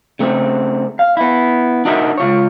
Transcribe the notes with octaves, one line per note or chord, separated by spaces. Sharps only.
C#3 A3 C4
F5
B3 E4
D4 D#4 F#4 A4 A#4 E5
C#2 F4 C#5